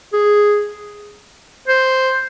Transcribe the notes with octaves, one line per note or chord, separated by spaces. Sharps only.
G#4
C5